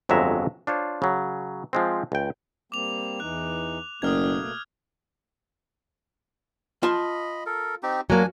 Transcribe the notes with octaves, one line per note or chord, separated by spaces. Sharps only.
G1 F2 F#3 G#3 E5 A#5
D4 F4 C5 C#5
C#3 F#3
F3 G#3 C4
C#2 G5
G3 A#3 C4 D6 F7
E2 E3 D#4 F#6
F#1 B2 A3 A#3 D#6 F6 G#6
F4 D#5 A5 B5
A4 A#4
C4 D#4 G4
F#3 A#3 D4 G#5